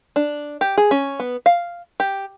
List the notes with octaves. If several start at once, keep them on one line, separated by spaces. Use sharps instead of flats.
D4
G4
G#4
C#4
B3
F5
G4